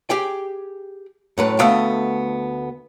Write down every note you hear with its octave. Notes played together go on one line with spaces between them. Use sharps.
G4 G#4 G5
F#2 A2 B4
D2 A3 B3 D#5 F5 G5